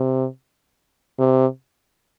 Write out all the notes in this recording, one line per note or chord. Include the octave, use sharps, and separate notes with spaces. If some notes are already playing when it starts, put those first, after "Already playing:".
Already playing: C3
C3